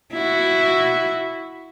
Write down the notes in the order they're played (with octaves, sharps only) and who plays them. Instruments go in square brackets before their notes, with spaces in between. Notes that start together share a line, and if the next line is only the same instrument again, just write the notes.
[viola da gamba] E4 F#4